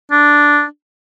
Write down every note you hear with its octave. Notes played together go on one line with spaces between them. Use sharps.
D4